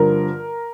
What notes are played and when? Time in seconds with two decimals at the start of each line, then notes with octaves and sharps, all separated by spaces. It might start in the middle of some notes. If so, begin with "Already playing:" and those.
Already playing: G2 D3 F3 A#4